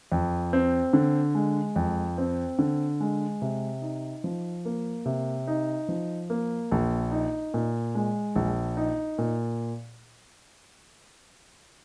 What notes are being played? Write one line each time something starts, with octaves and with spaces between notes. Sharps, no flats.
F2
C4
D3
G#3
F2
C4
D3
G#3
C3
D#4
F3
A#3
C3
D#4
F3
A#3
A#1
D#4
A#2
G#3
A#1
D#4
A#2